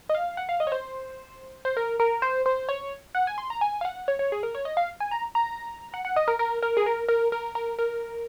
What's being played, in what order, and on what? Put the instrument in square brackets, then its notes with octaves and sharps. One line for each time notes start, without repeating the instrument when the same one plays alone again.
[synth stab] D#5
F5
F#5
F5
D#5
C#5
C5
C5
A#4
A#4
C5
C5
C#5
F#5
G#5
C6
A#5
G#5
F5
F#5
C#5
C#5
G#4
A#4
C#5
D#5
F5
G#5
A#5
A#5
F#5
F#5
D#5
A#4
A#4
A#4
G#4
A#4
A#4
A#4
A#4
A#4